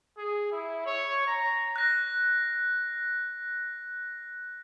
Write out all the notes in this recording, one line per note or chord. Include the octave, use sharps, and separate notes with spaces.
G#4
E4
C#5
A#5
F#6 A#6